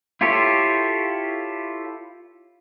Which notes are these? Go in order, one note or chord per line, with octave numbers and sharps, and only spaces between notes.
E4 F4 G4 A4 C#5